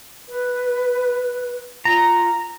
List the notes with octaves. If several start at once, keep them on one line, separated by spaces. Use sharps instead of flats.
B4
F4 A#5